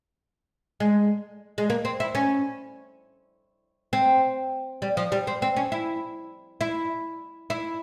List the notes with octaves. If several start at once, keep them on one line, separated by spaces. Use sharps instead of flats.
G#3
G#3
A#3
C4
E4
C#4
C4
G3
F3
G3
C4
C4
C#4
E4
E4
E4